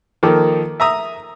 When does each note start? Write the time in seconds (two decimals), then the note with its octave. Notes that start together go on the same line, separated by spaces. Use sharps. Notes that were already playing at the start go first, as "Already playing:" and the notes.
0.23 D#3 F3 A#3 A4 A#4 D6
0.80 E5 A#5 D#6